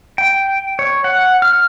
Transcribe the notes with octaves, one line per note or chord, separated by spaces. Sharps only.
G5
C#5
F#5
F6